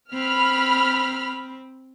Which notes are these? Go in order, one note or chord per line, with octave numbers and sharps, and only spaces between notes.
C4 B5 F6